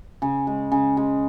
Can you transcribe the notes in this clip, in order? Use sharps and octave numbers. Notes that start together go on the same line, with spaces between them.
C#3
G#3
C#3
G#3